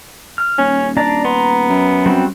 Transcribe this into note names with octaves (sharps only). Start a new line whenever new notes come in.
F6
D#1 C#4
D4 D5 A#5
B3 A#5 C6
F#2
G3 C4 F#4